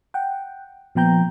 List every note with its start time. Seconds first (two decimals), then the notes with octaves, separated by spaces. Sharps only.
0.14 F#5 G5
0.95 A#2 F3 B3 G5 A#5 G6